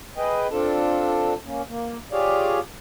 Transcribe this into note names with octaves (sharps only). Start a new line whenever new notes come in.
G#4 B4 D#5 G5
C4 D4 F4 A4 A5
A#3 C#4
A#3
F4 G4 G#4 C#5 D5 F5